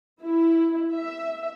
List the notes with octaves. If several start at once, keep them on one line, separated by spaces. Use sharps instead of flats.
E4
E5